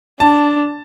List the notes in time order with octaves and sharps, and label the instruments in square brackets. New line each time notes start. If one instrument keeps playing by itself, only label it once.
[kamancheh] D4 [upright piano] A5